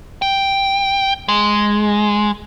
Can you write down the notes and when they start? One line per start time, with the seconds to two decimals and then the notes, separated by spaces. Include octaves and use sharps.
0.22 G5
1.28 G#3